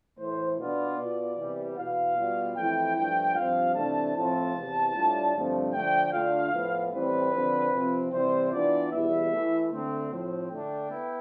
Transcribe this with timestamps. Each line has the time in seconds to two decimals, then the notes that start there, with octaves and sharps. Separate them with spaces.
0.18 A2 E3 A3 C5
0.57 B2 B3 D4 F4 D5
0.97 B2 B3 F4
1.37 E2 C3 E3 G3
1.77 E2 B2 B3 F5
2.17 B2 G3 B3 F4
2.56 F2 E3 A3 E4 G5
2.96 G2 F3 A3 G5
3.35 G2 F3 C4 F4 F5
3.76 C3 E3 A3 D4 A5
4.15 A2 F3 C4 F4 A5
4.55 E2 C3 E3
4.95 A2 G3 D4 F4
5.35 G2 D3 F3 A3 C4
5.74 D3 F3 A3 G5
6.13 D3 A3 D4 F4 F5
6.53 A2 F3 B3
6.93 A2 E3 G3 C4 B4
7.32 D3 F3 C4
7.72 C3 F3 C4 F4
8.12 C3 E3 G3 C5
8.52 E3 B3 D4 F4 D5
8.92 E2 B2 G3 B3 E4 E5
9.32 E3 A3 E4
9.71 D3 A3 C4
10.11 A2 F3 C4
10.50 D3 A3 D4 G5
10.90 B3 E4